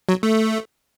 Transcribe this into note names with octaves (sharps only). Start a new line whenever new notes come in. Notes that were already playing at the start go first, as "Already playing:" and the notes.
F#3
A3